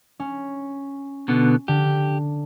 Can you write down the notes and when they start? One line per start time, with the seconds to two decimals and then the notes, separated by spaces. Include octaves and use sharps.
0.20 C#4
1.28 B2 D3 B3
1.68 D3 G4